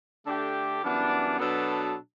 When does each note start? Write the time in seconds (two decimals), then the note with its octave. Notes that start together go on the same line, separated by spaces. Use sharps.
0.25 D3 A3 D4 G4
0.82 F#2 E3 G3 B3 D4
1.38 B2 F#3 B3 D4 A4